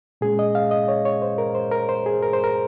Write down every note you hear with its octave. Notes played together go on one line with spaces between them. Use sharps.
A#2 G#3 C#4 G#4
D#5
F5
D#5
C#5
C#5
C5
A#4
C5
A#4
C5
G#4
A#4
C5
A#4